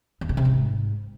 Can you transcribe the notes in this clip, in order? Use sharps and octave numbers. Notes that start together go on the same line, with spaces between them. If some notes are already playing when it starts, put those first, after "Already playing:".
E2
B2
C3
G#2